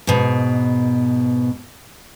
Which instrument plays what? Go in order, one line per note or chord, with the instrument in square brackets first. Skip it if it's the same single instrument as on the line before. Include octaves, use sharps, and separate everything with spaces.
[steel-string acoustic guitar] G#2 B2